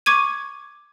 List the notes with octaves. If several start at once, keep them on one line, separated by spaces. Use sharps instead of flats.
C#6 D6 G#6 D#7